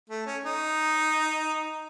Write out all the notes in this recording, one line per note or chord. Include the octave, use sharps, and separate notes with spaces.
A3
C#4
D#4